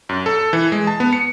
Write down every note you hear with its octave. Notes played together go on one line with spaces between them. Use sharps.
F#2
A4
E3
G#3
A5
B3
C#7